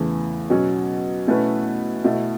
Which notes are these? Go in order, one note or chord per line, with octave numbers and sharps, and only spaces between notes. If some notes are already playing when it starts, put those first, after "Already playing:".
Already playing: E2 C#3 E3 A3
B2 F#3 C#4
B2 A3 C#4 E4 B4
B2 A3 E4